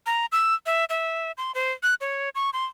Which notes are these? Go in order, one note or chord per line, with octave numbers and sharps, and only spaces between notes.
A#5
E6
E5
E5
C6
C5
F#6
C#5
C#6
C6